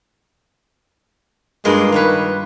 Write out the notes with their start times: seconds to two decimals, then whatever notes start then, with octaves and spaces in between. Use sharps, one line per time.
1.65 G2 G#3 A#3 F4
1.92 D#3 B4 C#5 F5